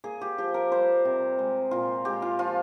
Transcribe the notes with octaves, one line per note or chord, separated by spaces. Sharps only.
A#3 G#4
G4
F3 G4
A#4
G3 C5
C3
G#3
A#2 F4
G#3 G4
F4
F3 F4